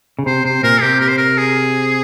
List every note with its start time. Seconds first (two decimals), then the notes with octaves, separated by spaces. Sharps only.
0.19 C#3
0.26 C3 C5
0.45 C3 C5
0.63 A#2 A#4
0.81 C3 G4
1.00 A#4
1.09 C5
1.18 A#4
1.38 G#4